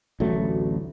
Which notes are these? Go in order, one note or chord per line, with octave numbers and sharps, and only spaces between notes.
A1 D2 F#3 A3